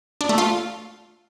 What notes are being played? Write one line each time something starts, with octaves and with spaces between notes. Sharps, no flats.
D4
A3
F4